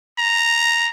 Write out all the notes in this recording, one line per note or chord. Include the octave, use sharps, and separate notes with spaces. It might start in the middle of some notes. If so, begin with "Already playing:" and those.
A#5